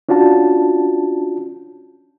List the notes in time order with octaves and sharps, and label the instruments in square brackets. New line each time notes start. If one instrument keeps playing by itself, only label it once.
[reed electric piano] C#4 D4 F4 F#4 A5